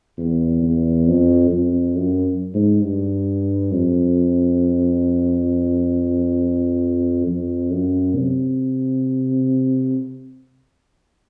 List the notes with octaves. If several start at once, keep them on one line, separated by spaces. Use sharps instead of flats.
E2
E2
F2
F2
F#2
G#2
G2
F2
F2
F#2
C3